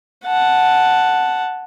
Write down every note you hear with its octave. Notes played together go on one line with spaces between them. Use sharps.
F#5 A5